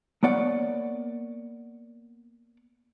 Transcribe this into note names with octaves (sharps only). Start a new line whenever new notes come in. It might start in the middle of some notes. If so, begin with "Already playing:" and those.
A#3 B3 C#5 D5 F#5